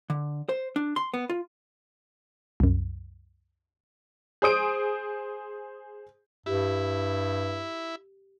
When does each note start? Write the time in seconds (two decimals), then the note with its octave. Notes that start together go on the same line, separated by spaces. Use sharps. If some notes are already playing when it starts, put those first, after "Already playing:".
0.10 D3
0.49 C5
0.76 D4
0.96 C6
1.14 B3
1.30 F4
2.60 C2 F#2
4.42 G#4 C5 D#6 D7
6.46 G2 E4 G4